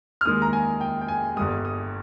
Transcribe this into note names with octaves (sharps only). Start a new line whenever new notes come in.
F6
D#2 D#3 G#3 D#6
A#5
G#5
G5
G5
G#5
G1 G2 G3 D#6
D#6